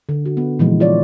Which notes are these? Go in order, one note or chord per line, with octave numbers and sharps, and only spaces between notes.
D3
F#4
B3
A#2 E3 F3 G#3
F4 C#5 D5